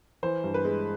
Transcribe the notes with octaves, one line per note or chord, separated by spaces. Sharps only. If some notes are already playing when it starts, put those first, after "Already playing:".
E3 C5
G2
B4
G#3